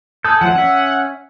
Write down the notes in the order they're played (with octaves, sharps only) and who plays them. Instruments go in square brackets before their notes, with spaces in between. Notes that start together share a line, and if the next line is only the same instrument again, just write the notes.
[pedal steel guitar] G#4 D#6 G6 [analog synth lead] A4
[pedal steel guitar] F3 F#3 A3 [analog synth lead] F#5
[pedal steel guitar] C#4 E5